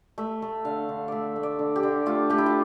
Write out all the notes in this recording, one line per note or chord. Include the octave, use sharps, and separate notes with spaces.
A3 E5
A3
D3 F5
D3
A3 D5 E5
A3
D5
D3
G4
D3
A3 F4
A3 G4
E4
F4